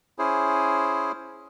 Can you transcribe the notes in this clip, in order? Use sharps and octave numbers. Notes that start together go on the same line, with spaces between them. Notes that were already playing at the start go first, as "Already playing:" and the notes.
C#4 E4 G#4 C5